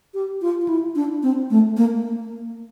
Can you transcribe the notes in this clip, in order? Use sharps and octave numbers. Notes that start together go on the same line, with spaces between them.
G4
F4
F4
E4
D4
C4
A3
A#3